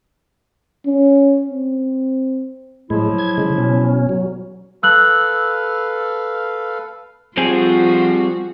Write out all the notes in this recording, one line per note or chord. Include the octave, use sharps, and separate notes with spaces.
C#4
C4
A2 F3 F#3 G#3 E4
G#6
C#3 G#3
B2 C#4
F#3
A4 B4 F5 E6 F#6 F#7
F3 G3 C4 F4 F#4 G#4